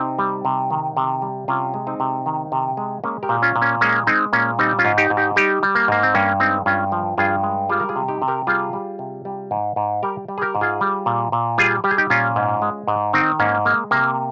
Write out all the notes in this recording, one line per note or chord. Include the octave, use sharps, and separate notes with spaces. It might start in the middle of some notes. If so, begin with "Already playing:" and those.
Already playing: C3 C4 D#4
G3
C3
D#3
C3
G3
C3 C#4 F4
G#3
C4 D#4
C3
D#3
C3
G#3
G#3 A#3 C#4
G4 A#4
A#2
C#4 F4
A#2
A#3 C#4
G#3 A#3 C#4
G#3 C4 D#4
A#2 A#3 C#4
G3 C4 D#4
C#4 F4
G#2
D#4 G4
G#2
D#4 G4
G3 D#4 G4
G3
A#3
G#2 A#3
C4
G2 A#3 C#4
G#3 C4 D#4
G2 C#4 F4
F3
G2 F4 G#4
G#3
G3 F4 G#4
A#4
F4 G#4
C3
D#4 G4
C3
G4 A#4
G3 F4 G#4
G3
C3
G3
G#2
G#2
G3 G4 A#4
G3
G#4
G4 A#4
G#2
F4 G#4
G3
A#2
A#2
G3 F4 G#4
G3 G4
G#4
D#4 G4
A#2 C#4 F4
G#2
G#3
G#2
D#3 C4 D#4
G#2 A#3 C#4
G#3 A#3
C3 A#3